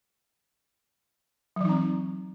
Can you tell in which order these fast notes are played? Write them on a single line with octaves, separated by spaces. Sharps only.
F#3 E3 D#4 C4